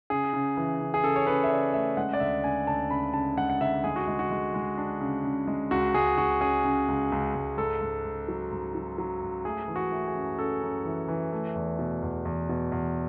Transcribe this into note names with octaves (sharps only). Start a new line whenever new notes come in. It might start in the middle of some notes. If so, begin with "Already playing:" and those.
C#3 G#4
C#3
E3
C#3
G#4
C#3 A4
C#5
C#3 B4
E5
C#3 D5
A3 E5
G#3 F#5
D5
D2 E5
C#3 G#5
D2 A5
C#3 B5
C#3 A5
G#3 F#5
F#5
D2 E5
G#3 G#4
F#4
G#3
F#4
G#3
G#3
D4
C#3
C#3
G#3
C#2 F#4
C#2 G#4
C#2 F#4
C#4 G#4
C#3
C#2
C#2
C#2
G#2 A4
G#2
G#2
F#3
G#2
F#3
F#3
G#2
A3 G#4
E3
F#4
A3
G#4
F#2
C#4 A4
F#2
E3
E3
A3
E2
B2
E2
E2
B2
E2